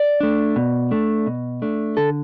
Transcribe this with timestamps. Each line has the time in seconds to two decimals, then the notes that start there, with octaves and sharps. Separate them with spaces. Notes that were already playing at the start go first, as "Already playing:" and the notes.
Already playing: D5
0.20 A3 D4
0.56 B2
0.91 A3 D4
1.27 B2
1.62 A3 D4
1.97 D3 A4